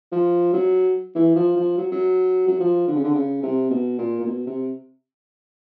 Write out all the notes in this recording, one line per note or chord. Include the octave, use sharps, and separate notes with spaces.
F3
F#3
E3
F3
F3
F#3
F#3
F#3
F3
D3
C#3
D3
C#3
C3
B2
A#2
A#2
B2
C3